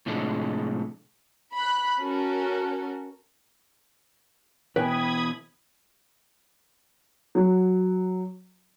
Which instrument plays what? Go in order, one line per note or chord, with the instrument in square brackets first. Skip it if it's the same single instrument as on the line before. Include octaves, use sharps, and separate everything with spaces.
[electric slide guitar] A2 C3 F3 G#3 D4 A4
[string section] B5 F#6
C#4 F#4 A4 A#4
[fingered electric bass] B2 E3 [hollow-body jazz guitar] B4 G5 G#5 [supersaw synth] B5 D#6 G#6
[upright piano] F#3